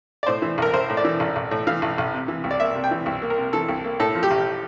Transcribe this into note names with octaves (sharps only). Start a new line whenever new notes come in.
D5
A2 C5
E3
A1 A#4
A1 C5
A2
D5
E3
A1
A1
A2
E3 F5
A1
A1
C3
E3
C2
D5
A#3 E5
C3
G5
E3
C2
A#3
A#4
C3
E3 A4
C2
A#3
A2 A4
F3
G4
A1